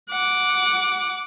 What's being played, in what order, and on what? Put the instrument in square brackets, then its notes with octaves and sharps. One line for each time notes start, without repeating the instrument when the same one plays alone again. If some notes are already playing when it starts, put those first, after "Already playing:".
[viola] F#5 D6